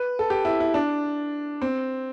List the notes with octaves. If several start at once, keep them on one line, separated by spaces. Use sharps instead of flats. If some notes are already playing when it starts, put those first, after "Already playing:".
Already playing: B4
A4
G4
E4
E4
D4
C4